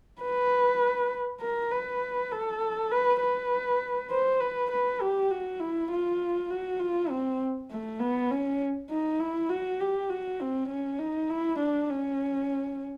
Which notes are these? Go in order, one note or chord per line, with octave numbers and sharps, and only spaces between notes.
B4
A#4
B4
A4
B4
B4
C5
B4
B4
G4
F#4
E4
F4
F#4
F4
C4
A3
B3
C#4
D#4
E4
F#4
G4
F#4
C4
C#4
D#4
E4
D4
C#4